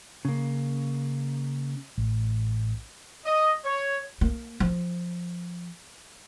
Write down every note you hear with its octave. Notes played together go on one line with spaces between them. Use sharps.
C#3 A#3
A1
D#5
C#5
A#3
F3